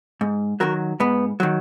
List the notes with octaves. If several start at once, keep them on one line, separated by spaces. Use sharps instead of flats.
G#2
D#3 F#3 F#4 A#4
G#2 B3
D#3 F#3